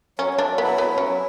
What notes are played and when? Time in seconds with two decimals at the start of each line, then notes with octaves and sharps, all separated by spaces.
0.18 F#3 C#4
0.33 F#3
0.38 D4
0.49 F#3
0.58 B3 E4
0.78 F#3 B3
0.93 F#3 C#4
1.07 E4